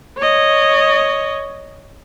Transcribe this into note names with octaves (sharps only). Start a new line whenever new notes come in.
C#5 D#5